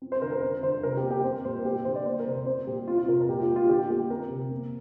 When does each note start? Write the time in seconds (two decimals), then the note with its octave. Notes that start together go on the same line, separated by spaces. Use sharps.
0.02 C4
0.12 C5
0.22 D3 A#4
0.32 A#4
0.42 C4 C5
0.63 D3 C5
0.83 C3 A#4
0.97 G4
1.03 A#3
1.11 G4
1.24 C4 C5
1.45 A#2 C5
1.59 A#4
1.65 A#3 G4
1.85 D3 C5
1.95 D5
2.06 A#3 C5
2.19 A#4
2.27 C3
2.33 C5
2.46 C4 C5
2.67 A#2 G4
2.88 C4 F4
2.98 F4
3.08 C3 A#4
3.21 A#4
3.29 A#2 G4
3.36 F4
3.42 G4
3.49 A#3
3.56 F4
3.69 D3 G4
3.90 A#3 G4
4.10 C4 A#4
4.31 C3
4.51 A#3